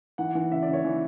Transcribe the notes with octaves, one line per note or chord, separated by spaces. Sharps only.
E3 F#5
E3
C#3 E5
D5
C#3
C#5
E3